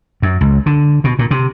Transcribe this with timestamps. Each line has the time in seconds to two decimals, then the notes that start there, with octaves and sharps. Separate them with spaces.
0.22 F#2
0.41 C#2
0.66 D3
1.04 B2
1.19 A#2
1.31 C3